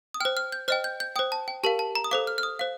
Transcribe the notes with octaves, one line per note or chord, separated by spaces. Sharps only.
D#6
C5 G5 F6
F6
G6
C5 D#5 G5 F6
G6
G6
C5 G5 D#6
A5
G5
G4 A#4 F5 A5
A5
A#5
D#6
A4 C5 F5 D6
F6
F6
D#6
C5 F5